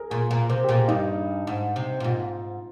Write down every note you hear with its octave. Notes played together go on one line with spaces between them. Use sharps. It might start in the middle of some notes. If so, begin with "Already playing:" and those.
Already playing: G#4 A#4
A#2 G#4
A#2
C3 A#4
G4
A#2 G#4
G2 D#4
G#2
C3
A#2
G#2 F4